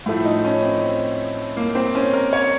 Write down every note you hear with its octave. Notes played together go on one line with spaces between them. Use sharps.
A2 F3 A3
D#4
C#4
C4
A#3
C4
C#4
A#4
C#5